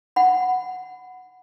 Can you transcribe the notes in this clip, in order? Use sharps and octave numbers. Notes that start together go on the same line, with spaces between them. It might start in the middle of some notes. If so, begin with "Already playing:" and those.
F#5 B5